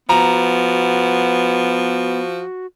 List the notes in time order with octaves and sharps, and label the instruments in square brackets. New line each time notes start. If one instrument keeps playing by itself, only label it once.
[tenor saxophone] F3 [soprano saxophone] B3 [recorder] F#4 [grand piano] A#5